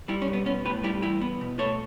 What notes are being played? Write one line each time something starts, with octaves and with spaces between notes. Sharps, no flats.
G3 E4 G4
C#4
B1
B3
B3 C#4
A2 G4 B4
G3 E4 G4
E2 E4 G4
B3
B2
A3 A4 C#5